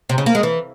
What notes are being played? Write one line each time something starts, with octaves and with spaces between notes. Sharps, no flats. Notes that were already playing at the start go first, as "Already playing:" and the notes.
C3
C#3
A#3
G#3
E3